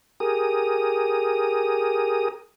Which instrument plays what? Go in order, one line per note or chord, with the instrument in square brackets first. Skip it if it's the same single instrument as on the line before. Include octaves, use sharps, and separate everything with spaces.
[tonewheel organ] G4 G#4 A#4 D#6